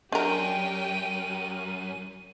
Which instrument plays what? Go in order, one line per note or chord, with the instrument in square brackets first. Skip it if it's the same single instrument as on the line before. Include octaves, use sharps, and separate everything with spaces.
[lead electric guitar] F#2 [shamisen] D4 A#4 [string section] G4 G5 [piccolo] D#7